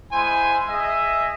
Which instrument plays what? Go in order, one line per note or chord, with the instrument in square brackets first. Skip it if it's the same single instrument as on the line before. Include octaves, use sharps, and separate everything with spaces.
[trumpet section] G#3 E4 C5 G#5
G#4 D#5 E5